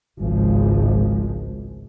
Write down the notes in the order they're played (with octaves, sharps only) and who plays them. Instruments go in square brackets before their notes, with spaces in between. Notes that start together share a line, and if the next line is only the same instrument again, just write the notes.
[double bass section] G#1 C#2 A2 C#3 F3 G#3